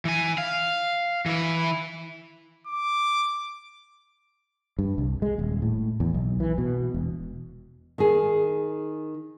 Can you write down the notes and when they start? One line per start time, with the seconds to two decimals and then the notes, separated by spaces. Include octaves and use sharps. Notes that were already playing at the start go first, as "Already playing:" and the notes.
0.05 E3 G#5
0.38 F5
1.26 E3 E4
2.67 D6
4.79 G2
4.98 C2
5.22 G#3
5.39 D#1
5.62 A2
6.00 E2
6.14 B1
6.40 E3
6.58 B2
6.94 E1
7.98 D#3 G#4